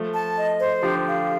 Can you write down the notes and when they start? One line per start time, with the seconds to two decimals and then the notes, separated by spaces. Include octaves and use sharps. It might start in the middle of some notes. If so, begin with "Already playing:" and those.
Already playing: F3 A3
0.14 A5
0.38 D#5
0.60 C5
0.83 D3 F3 G4
1.06 F5